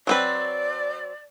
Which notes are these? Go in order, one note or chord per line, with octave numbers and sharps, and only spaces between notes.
F#3 C4 B4 D5